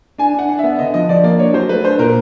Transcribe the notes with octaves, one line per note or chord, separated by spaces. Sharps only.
D4 G#5
D4 F#5
D4
E5
B3
D3 D#5
F3 D#5
F3 D5
A#3 D5
D4 C#5
F#3 C5
A3 B4
D4 C5
A#2 A#4